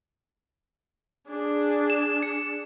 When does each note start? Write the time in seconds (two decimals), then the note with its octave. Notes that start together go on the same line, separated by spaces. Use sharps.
1.28 D4 G#4
1.90 E7
2.23 C#7